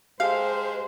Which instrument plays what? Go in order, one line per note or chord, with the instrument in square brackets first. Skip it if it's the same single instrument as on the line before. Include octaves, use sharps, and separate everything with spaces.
[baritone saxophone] G#3 [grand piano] G4 A4 [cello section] C5 [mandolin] F5